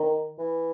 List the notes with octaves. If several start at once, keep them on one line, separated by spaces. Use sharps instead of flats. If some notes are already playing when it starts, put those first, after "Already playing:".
Already playing: D#3
E3